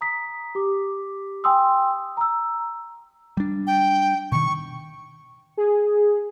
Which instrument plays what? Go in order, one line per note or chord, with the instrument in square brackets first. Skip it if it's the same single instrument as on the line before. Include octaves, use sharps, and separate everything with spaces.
[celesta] A#5 D#6 B6
G4 D6
G5 G#5 C6 D#6 E6
A#5 E6
[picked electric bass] G3 D4
[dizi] G5
[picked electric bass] B2 D#3 [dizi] C#6
[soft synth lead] G#4